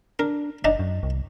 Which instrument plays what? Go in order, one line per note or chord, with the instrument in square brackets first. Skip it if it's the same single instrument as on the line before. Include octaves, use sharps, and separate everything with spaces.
[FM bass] D4 [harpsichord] A#4
[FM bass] F#1 [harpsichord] D4 D#4 D#5
[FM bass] F#2
C2